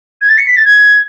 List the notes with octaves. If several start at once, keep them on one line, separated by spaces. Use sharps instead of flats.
G#6
A6
C#7
B6
A6
G#6